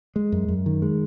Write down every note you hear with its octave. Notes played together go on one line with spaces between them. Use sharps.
G#3
F#2
F#2
D#3
G#3